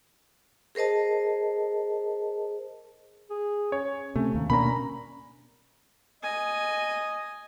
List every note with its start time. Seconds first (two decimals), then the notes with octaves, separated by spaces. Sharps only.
0.75 G#4 A#4 C5 D#5 A5
3.30 G#4
3.72 C#4 C#5
4.16 C3 A3 C#4
4.35 D#2 A#3
4.50 B2 A#3 C#4 D4 A#5 B5
6.23 D#5 G#5